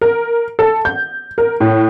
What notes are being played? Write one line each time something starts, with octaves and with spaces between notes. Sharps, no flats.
A#4
A4
G6
A#4
A2